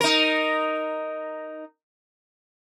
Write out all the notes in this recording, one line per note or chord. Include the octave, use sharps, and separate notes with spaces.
D#4 A#4